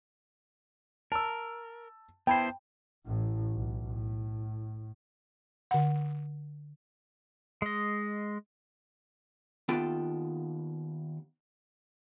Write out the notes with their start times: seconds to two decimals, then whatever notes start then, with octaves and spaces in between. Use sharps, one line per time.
1.12 A#4 A5 E6
2.27 B3 E4 C5 G5 A5 B5
3.06 A1 A2
3.53 B1
3.89 A2
5.71 D3 F#5
7.62 G#3 D#5
9.68 D#2 B3 F4 A4 G5